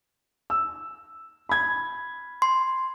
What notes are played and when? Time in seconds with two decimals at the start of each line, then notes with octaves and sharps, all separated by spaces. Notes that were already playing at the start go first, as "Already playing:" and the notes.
0.50 E6
1.49 B5 G#6
2.42 C6